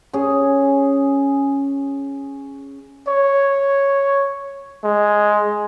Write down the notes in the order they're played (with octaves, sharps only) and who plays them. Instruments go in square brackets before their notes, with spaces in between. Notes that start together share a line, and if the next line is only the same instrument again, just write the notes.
[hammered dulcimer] C#4 G#4
[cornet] C#5
G#3